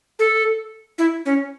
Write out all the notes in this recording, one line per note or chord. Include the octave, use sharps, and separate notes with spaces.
A4
E4
C#4